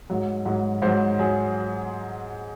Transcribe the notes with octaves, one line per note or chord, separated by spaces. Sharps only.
G#2 F#3
G#2 F#3
G#2 F#3 C5
F#3 G#4